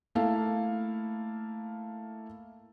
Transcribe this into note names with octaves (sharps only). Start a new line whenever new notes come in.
A3 A#3 E4 A4 F5